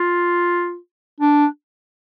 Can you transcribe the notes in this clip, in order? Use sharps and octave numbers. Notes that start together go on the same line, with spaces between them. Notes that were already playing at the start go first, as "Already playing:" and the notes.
Already playing: F4
D4